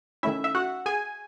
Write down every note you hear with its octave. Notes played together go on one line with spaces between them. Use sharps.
D#3 A3 C#4 E4 E5
E5
F#4 F#5
G#4 G#5